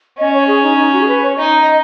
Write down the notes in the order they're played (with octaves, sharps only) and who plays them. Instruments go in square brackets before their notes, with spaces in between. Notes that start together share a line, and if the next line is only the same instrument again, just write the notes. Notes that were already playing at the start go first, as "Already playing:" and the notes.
[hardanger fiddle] C#4 [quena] D#5
[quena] C#5
G#4
D#4
D#4
F#4
G#4
B4
C#5
[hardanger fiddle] D#4 [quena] D#5